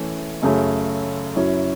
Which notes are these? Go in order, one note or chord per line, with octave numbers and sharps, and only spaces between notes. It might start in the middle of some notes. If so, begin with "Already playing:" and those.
Already playing: E3 A3 C#4 E4
F#2 C#3 A3 C#4
F#2 F#3 C#4 E4